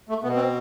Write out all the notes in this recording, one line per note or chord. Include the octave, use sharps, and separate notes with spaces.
A3
B2 B3
C4